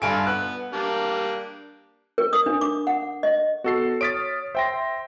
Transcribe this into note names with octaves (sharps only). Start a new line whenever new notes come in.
G2 F4 A4 G#5 D7
B3 F#6
G3 A#3 D4
A#4
D#6
D4
D6
F#5
D#5
B3 F#4 A4 C7
C#5 D#6 F6 A6 B6 D7
C5 E5 G5 C6 A#6